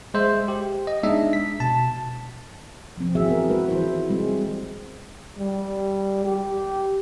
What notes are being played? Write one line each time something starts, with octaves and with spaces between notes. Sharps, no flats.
G#3 C5 E5
G4
D#5
G#3 B3 D4 D#4 D#5 E5
B6
B2 A5
F3 C4
E3 C4 F#4 G#4 E5
B3 C4 A#4
G#3 F#4 B4
D#3 E3 E4 C5
G3 G#3 C4
G3
G4